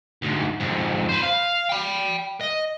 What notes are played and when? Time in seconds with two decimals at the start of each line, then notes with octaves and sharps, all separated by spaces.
0.22 D2 G#2
0.60 F2 G#2
1.09 B4 C5
1.23 F5
1.69 G5 B5
2.41 D#5